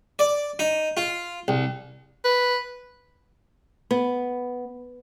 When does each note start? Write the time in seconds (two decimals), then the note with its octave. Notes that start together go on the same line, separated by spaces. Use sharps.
0.19 D5
0.59 D#4
0.97 F4
1.48 C2
2.25 B4
3.91 B3